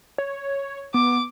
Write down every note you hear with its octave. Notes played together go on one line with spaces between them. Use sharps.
C#5
B3 D6